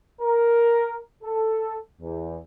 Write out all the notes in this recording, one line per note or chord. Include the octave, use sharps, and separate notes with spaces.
A#4
A4
E2